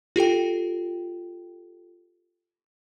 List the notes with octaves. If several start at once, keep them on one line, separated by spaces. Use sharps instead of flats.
F4 G4 A4 G5